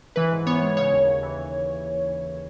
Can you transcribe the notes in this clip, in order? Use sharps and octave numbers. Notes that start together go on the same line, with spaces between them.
E3 B4
G#2
B3 C#5
G#3
C#3 C#5
D#2
D#2
E3